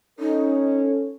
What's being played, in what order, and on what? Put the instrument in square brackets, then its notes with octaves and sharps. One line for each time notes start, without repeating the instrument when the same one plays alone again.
[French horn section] C#4 A4 [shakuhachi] D#4